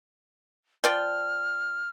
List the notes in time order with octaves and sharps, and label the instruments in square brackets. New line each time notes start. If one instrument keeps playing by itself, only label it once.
[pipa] F3 D5 G5 [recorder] F6